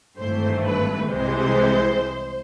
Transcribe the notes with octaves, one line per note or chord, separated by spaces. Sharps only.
G#1 G2 E3 A3 C5
B4
C2 C3 E3 G#3 C5